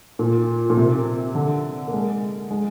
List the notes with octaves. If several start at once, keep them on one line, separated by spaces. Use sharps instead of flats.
A#2
A#2
C3
D3
A#3
G#3
G#3